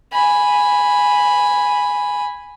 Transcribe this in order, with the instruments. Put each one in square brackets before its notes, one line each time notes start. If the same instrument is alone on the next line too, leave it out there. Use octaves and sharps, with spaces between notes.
[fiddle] G#5 B5